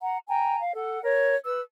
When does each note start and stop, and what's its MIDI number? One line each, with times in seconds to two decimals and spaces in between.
0.01 0.18 78
0.01 0.18 82
0.28 0.59 79
0.28 0.59 80
0.28 0.59 82
0.61 0.71 77
0.75 1.02 69
0.75 1.02 78
1.04 1.34 70
1.04 1.34 73
1.45 1.60 71
1.45 1.60 88